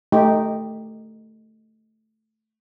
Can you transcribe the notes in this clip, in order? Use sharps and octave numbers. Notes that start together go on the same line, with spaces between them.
A3 D#4 G4